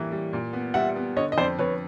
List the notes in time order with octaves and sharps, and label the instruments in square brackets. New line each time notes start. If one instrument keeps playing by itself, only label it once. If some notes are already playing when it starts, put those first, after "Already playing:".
Already playing: [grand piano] A2 E3 G3 A#3
G3
A#2
B3
[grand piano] G3 [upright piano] E5 F#5
[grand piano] B3
[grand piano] D3 [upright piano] C#5 D#5
[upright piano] D#5
[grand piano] F2 [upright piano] C5 D5
[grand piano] F2 [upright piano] B4 C#5